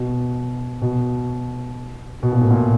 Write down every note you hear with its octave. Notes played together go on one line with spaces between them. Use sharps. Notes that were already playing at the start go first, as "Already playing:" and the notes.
Already playing: B2
B2
B2
A#2
A2
A#2